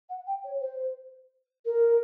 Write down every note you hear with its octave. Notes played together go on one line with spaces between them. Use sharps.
F#5
G5
C#5
C5
A#4